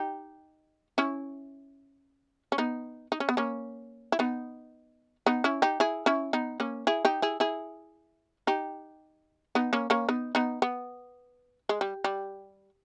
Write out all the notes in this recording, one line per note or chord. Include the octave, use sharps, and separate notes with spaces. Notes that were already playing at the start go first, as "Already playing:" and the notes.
Already playing: D#4 G4
C#4 E4
C#4
B3 D#4
D#4
C#4
B3
A#3 C#4
E4
B3 D#4
B3 D#4
C#4 E4
D#4 G4
E4 G#4
C#4 E4
B3 D#4
A#3 C#4
E4 G#4
D#4 G4
E4 G#4
E4 G#4
D#4 G4
B3 D#4
A#3 C#4
A#3 C#4
B3 D#4
B3 D#4
B3
G#3
G3
G3